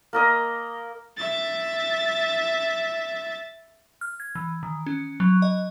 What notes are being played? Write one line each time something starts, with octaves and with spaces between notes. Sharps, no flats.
A#3 A#4 D#5
E5 A6
F6
G#6
E3
D#3
C#4
F#3
D#5